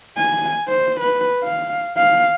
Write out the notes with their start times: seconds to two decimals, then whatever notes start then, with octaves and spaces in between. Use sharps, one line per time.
0.17 G#5
0.68 C5
1.01 B4
1.44 F5
1.97 F5